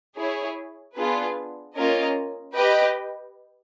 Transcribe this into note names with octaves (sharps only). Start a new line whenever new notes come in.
E4 G#4 C#5
B3 D4 F4 G#4 B4
A#3 C#4 F4 A#4 D#5
G4 B4 D#5 G5